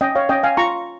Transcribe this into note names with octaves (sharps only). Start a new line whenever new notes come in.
C#4 D#5 G5
C#5 F5
C#4 D#5 G5
F5 G#5
F4 A#5 C#6